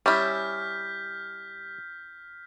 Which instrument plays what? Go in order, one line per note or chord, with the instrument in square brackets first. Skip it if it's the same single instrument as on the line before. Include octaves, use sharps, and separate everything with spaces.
[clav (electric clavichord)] G3 [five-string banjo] C#4 E4 [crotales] F6 G6 B6